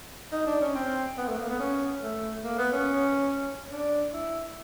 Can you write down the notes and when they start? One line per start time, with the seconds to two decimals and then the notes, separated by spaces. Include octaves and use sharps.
0.32 D#4
0.47 D4
0.61 C#4
0.75 C4
1.18 B3
1.28 A3
1.38 A#3
1.50 B3
1.60 C#4
2.03 A3
2.44 A#3
2.59 B3
2.73 C#4
3.72 D4
4.14 E4